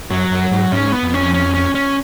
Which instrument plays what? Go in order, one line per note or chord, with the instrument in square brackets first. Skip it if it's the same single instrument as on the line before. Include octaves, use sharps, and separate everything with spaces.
[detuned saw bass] F#2 [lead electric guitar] F#3
[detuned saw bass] F#2
G#2
[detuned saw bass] G#2 [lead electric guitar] C#4
[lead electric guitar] B3
[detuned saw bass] F2
[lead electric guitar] C#4
C#4
C#4
C#4